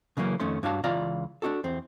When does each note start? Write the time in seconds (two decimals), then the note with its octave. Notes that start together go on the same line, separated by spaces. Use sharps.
0.17 C#3 E3 F#3 A#3 C#4
0.40 F2 D#3 A3 C#4 C6
0.63 G2 D4 F#4 C#5 F5 A5
0.84 C#2 E3 F4 D5 F5 A#5
1.42 D4 D#4 F#4 A4
1.64 E2 C4